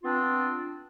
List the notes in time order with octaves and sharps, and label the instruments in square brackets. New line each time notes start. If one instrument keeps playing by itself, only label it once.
[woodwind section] B3 C4 D4 F4